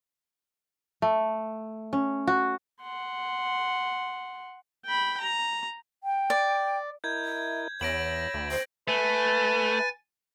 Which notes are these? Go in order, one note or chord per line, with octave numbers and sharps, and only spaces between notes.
A3
C#4
F#4
F#5 C6
G5 B5
A#5
G5
D5
E4 A#4 D#5 G6 G#6
E5
E2 C#5 B5 E6 A#6 D7 F#7
D2
C5
A3 B4 G#5 A6